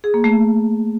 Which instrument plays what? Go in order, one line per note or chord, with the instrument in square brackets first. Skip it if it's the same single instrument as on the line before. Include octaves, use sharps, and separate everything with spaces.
[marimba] G#4
A#3
A3